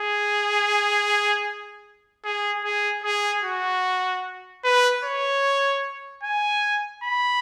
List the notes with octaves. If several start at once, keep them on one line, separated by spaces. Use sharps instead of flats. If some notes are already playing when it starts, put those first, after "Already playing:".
Already playing: G#4
G#4
G#4
G#4
F#4
B4
C#5
G#5
B5